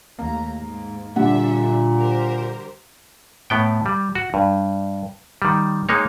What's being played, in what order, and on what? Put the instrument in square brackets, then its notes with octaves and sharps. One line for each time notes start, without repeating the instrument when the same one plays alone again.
[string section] D#2 A3 A#5 [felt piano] A#3
[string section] G#2
[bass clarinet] A#2 [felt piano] D3 G3 F#5 [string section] D4 A4 E5
[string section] G4 A#4 C5
[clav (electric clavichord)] A2 B3 G5
G3
F#4
G2
D#3 G3
G#3 A#3 D#4 C#5